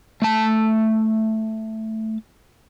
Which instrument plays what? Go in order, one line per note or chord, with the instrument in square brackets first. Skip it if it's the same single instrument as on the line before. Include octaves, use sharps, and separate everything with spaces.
[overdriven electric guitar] A3 A5